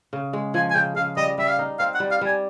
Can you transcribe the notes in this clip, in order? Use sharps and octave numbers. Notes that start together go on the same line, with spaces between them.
C#3
G#3
F3 G#5
G#5
C#3 G5
C#3 F5
G3 D#5
G3 E5
F5
D#4
C4 F5
F#5
G3
F5
G3 G#5